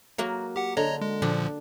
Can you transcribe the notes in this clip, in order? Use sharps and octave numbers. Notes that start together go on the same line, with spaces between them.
F#3 A#3 F#4
G4 F#5
D3 C#5 D#5 A#5
G#3
A#2 D3 F3 D4